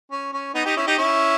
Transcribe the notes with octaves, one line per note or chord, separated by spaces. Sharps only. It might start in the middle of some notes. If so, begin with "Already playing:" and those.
C#4
C#4
B3 D#4
D#4 G4
C#4 E4
D#4 G4
C#4 E4